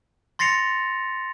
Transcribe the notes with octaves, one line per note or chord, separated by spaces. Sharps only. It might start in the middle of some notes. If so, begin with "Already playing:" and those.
C6 A6 A#6 C7 C#7 F7